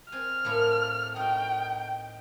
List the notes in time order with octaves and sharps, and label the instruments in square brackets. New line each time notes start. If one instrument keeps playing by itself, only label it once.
[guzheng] C4 G#5 [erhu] F6
[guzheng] A2 A3 A#3
[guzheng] D#4 F#4 [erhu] G5